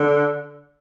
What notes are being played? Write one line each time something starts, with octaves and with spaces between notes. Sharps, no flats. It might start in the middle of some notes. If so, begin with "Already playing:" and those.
Already playing: D3